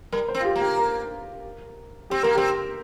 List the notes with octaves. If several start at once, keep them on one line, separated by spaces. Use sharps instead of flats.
G3 A#4
C5
C4
F4
G4
A#3
G4
A#4
C4 G4
A#3 A#4
C4 G4